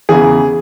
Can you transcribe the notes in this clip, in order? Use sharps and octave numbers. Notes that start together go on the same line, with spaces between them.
E2 C#3 E3 G#4